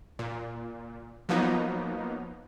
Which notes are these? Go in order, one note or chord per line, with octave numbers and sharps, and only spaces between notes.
A#2
F3 F#3 A#3 B3 D#4